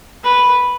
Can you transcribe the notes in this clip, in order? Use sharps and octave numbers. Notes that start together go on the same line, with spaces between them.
B4